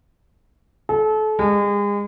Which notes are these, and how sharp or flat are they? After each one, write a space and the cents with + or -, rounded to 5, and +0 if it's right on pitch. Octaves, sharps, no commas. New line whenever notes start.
A4 -30
G#3 -35